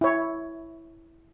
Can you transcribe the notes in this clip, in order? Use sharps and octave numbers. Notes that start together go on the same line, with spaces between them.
E4 C#5